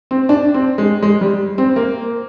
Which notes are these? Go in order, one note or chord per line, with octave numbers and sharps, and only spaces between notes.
C4
D4
C4
G#3
G#3
G3
C4
A#3